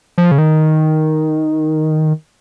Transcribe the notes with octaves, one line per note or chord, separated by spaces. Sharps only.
F3
C#3
D#3